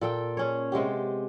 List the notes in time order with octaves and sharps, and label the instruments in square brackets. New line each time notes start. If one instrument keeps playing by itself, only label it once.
[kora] A#2 A4 G5
C#4 G#4 C#5
C3 G#3 B3 G4